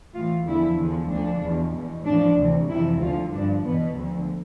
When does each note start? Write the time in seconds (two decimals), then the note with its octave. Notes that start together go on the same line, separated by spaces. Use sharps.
0.14 A2 E3 F4
0.45 E2 D3 F3 E4
0.77 E2 D3 F3
1.09 D2 D3 F3 D4
1.41 E2 B2
1.73 E2 B2
2.04 A2 F3 D4
2.37 D2 C3 E3
2.68 F2 C3 E3 E4
3.00 D2 D3 F3 F4
3.32 G2 F3 D4
3.64 E2 B2 B3
3.96 D2 D3 F3